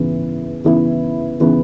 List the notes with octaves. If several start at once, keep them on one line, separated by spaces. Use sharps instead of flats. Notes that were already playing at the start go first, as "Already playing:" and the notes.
Already playing: C#3 E3 B3 E4
C#3 E3 B3 E4
C#3 E3 B3 E4